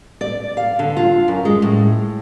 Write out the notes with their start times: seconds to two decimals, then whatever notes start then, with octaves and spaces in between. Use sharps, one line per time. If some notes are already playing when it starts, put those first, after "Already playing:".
0.21 D5
0.57 F5
0.79 D3
0.97 F4
1.28 F#2
1.45 G#3
1.62 A2